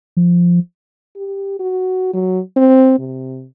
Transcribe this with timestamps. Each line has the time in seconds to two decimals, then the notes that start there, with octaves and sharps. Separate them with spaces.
0.17 F3
1.17 G4
1.60 F#4
2.14 F#3
2.56 C4
2.99 C3